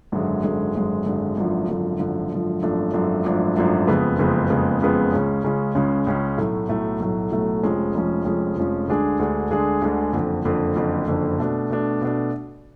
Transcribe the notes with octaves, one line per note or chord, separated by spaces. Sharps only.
G#1 F#2 D3 G#3
G#1 F#2 D3 G#3
G#1 F#2 D3 G#3
G#1 F#2 D3 G#3
G#1 F#2 D3 F3
G#1 F#2 D3 F3
G#1 F#2 D3 F3
G#1 F#2 D3 F3
G#1 F#2 F3 A3 D4
G#1 F#2 F3 A3 D4
G#1 F#2 F3 A3 D4
G#1 F#2 F3 A3 D4
F#1 F2 C#3 G#3 B3
F#1 F2 C#3 G#3 B3
F#1 F2 C#3 G#3 B3
F#1 F2 C#3 G#3 B3
C#2 C#3 G#3 C#4
C#2 C#3 G#3 C#4
C#2 C#3 G#3 C#4
C#2 C#3 G#3 C#4
B1 A2 F#3 A3
B1 A2 F#3 A3
B1 A2 F#3 A3
B1 A2 F#3 A3
F1 F2 F3 G#3 C#4
F1 F2 F3 G#3 C#4
F1 F2 F3 G#3 C#4
F1 F2 F3 G#3 C#4
D2 D3 G#3 D4 G#4
D2 D3 G#3 D4 G#4
D2 D3 G#3 D4 G#4
D2 D3 G#3 D4 G#4
F#1 F2 D3
F#1 F2 D3
F#1 F2 D3
F#1 F2 D3
B2 A3 D4
B2 A3 D4
B2 A3 D4